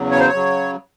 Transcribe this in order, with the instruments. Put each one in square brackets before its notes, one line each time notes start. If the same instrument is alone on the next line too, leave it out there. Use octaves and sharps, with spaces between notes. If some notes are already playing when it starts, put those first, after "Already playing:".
Already playing: [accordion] E2 C#3 F#3
C#5
C5
C#5
C#3 F#3